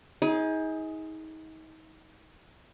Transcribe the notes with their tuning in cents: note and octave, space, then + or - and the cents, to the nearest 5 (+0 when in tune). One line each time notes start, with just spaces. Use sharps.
D#4 +35 G#4 +0